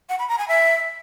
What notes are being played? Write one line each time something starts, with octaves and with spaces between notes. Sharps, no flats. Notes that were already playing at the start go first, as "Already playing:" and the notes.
F#5
B5
A#5
G#5
E5